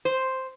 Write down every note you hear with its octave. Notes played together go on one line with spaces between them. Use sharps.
C5